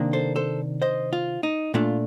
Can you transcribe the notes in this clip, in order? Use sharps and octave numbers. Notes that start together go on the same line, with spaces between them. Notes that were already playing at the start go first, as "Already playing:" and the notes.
Already playing: C3 D#3 A#3 D4
A4 C5
A4 C5
C5 D#5
F4
D#4
A#2 A3 D4 F4